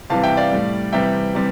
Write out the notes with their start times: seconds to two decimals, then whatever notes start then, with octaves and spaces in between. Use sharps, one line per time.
0.10 C3 E3 G3 F5 A5
0.23 E5 G5
0.37 D5 F5
0.51 A2 G3
0.93 C3 E3 G3 E5 G5
1.35 C3 E3 G3